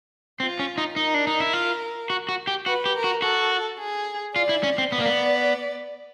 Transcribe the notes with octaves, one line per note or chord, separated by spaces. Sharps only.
C4 F4
C#4
D#4
D#4 A#4
D4
D#4
E4
F4
F#4
F#4
G4
F#4 B4
G4
A#4
F#4
F#4 A4
G#4
F4 D5
E4
C#4
C4
B3 D5
A#3
B3